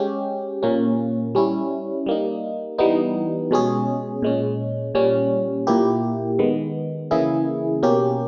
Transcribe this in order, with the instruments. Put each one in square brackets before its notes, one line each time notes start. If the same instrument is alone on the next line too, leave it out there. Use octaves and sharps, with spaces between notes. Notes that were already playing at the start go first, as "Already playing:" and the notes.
Already playing: [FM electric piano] G#3 C#4 G4
A#2 A#3 C#4
G3 C#4 E4
G3 A#3 D#4
E3 G3 B3 D#4
B2 G#3 C#4 G#4
A#2 G#3 C#4
A#2 G3 C#4
A#2 A#3 E4 G4
D#3 G#3 B3
C#3 E3 A#3 E4 G#4
B2 A#3 C#4 G4